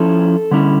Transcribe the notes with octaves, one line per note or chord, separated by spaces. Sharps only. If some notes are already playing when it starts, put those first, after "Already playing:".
Already playing: F3 C#4 E4 A4
D3 G3 C#4 E4